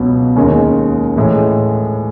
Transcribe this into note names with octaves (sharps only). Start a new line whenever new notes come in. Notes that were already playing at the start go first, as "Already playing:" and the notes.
Already playing: C#2 B2 F#3 B3
D#2 D#3 G#3 C#4
A2 E3 G#3